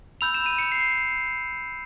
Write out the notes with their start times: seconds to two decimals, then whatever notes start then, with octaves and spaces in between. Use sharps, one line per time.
0.21 B5 E6 G6 F7
0.34 E7
0.46 D#7
0.58 C#7
0.72 C7